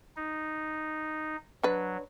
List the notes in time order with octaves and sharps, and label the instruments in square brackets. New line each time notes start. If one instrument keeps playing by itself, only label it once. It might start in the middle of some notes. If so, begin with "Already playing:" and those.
[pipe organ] D#4
[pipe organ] F#3 [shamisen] D4 B4